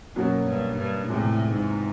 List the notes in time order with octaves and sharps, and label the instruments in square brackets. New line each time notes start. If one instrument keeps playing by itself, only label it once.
[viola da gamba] F#2 [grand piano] B2 F#3 A#3 C#4 F#4
[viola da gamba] G2
G2
[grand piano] E2 C3 F3 G#3 [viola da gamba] A2
[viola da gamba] G#2